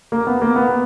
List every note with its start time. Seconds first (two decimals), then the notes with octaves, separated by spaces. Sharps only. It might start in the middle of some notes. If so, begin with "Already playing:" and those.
0.12 A#3
0.27 B3
0.42 A#3
0.56 B3